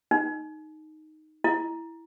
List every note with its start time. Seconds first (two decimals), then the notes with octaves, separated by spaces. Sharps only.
0.11 D#4
1.44 E4